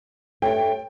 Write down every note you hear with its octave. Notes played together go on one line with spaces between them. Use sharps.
G2 A3 C#5 G5